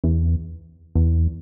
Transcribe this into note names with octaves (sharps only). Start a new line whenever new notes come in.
E2
E2